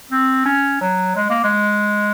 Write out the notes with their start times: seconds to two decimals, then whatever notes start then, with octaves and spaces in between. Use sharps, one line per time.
0.11 C4
0.46 C#4
0.81 F#3
1.16 G#3
1.30 A#3
1.44 G#3